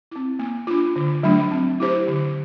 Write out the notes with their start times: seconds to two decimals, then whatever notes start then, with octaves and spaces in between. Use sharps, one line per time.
0.11 C4 E4
0.39 A#3
0.67 D4 F4
0.96 D3
1.23 F#3 A3 D4
1.51 C4
1.80 E4 G4 C5
2.08 D3